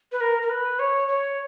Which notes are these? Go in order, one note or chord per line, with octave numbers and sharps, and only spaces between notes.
B4
A#4
A#4
B4
C#5
C#5